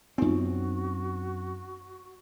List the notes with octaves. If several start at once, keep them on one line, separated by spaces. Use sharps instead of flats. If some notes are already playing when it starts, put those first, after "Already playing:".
F#2 B3 C4 D#4 F4 F#4